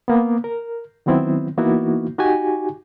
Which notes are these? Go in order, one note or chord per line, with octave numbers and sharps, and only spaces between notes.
A#3 B3
A#4
D#3 F#3 B3 C4 E4
E3 A#3 B3 D#4 E4 F#4
D#4 F#4 G4 G#5